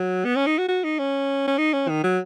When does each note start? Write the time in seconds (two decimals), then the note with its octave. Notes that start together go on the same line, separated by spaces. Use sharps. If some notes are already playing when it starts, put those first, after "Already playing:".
Already playing: F#3
0.25 B3
0.36 C#4
0.47 D#4
0.58 F#4
0.69 F#4
0.84 D#4
0.99 C#4
1.48 C#4
1.58 D#4
1.73 C#4
1.89 D#3
2.04 F#3